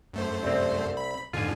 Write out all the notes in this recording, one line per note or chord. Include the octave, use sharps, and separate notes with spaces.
F#2 A3 C5
C2 C4
B5
F2 G#2 D3 F4 G#5